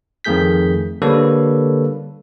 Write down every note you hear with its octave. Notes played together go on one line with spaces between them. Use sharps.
F2 D#3 A3 G#4 G6 B6
D3 G3 A#3 A4 B4 C#5